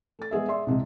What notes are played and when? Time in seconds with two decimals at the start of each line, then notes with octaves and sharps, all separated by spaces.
0.19 A3 A6
0.31 G#3 B3 G#4 E5
0.48 D5 E5 C6
0.67 C2 C3 G#3